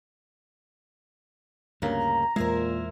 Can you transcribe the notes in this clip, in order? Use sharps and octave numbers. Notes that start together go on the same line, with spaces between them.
D2 G2 C#3 A#3 A#5
E2 A#2 G#3 E4 A#4 C5